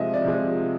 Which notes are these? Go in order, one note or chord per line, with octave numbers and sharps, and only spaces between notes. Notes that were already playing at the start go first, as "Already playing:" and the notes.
Already playing: C3 F3 G#3 D#5 E5
D5
C3 F3 G#3